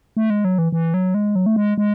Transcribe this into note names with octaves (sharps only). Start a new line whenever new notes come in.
A3
G#3
F#3
E3
E3
F#3
G#3
F#3
A3
G#3
G#3